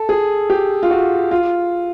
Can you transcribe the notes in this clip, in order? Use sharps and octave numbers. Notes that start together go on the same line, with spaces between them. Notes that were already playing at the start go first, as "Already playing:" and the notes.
Already playing: A4
G#4
G4
F4
F#4
F4